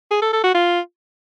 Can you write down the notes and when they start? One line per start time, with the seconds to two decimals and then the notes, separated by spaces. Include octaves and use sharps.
0.11 G#4
0.22 A4
0.33 A4
0.44 F#4
0.55 F4